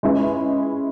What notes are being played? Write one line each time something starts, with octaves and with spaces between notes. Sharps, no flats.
G#3 C#4 E4 G#4 B4